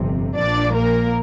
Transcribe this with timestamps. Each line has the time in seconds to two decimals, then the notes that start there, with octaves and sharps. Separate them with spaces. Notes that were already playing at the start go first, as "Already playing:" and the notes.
Already playing: G1 F2 C3
0.35 A#1 A#2 F3 D4 D5
0.74 A#3 A#4